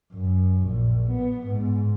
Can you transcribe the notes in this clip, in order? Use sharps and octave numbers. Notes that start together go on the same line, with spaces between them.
F#2
A#1
B3
G#2